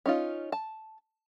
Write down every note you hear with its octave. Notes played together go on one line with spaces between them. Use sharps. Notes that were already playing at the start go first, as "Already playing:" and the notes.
C#4 D#4 F4
A5